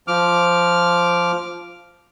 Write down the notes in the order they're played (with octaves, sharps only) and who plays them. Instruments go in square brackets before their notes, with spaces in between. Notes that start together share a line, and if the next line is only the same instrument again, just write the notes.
[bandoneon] F3 D6 F6